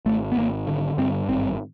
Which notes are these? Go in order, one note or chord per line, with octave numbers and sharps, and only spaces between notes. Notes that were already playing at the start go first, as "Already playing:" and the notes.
G#1 A3
B3
G#1 A#3
D3
G2 C4
G#1 C4